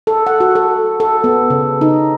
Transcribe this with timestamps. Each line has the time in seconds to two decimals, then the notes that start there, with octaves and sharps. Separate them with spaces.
0.07 A4
0.27 F#5
0.40 F#4
0.56 A4
1.00 A4
1.24 B3
1.50 C#3
1.81 D#4